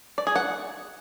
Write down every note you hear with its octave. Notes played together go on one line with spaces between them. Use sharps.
D5
G#4
F#5